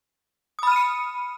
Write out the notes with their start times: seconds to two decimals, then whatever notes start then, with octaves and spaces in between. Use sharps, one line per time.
0.59 D#6
0.63 B5
0.67 F6
0.72 D#7
0.76 C#7